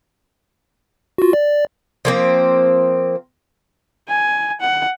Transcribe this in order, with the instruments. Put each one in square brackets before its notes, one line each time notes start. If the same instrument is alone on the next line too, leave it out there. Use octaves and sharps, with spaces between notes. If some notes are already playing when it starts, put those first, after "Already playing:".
[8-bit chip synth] F4 F#4
D5
[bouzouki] F3 A#3 C4
[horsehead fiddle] G#5
F#5